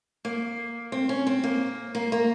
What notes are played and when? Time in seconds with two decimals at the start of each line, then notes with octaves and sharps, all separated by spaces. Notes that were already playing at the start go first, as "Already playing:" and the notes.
0.25 A#3
0.92 C4
1.09 C#4
1.27 C4
1.44 A#3
1.95 A#3
2.12 A#3